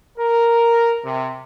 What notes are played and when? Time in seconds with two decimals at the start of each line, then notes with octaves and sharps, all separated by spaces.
0.19 A#4
1.05 C3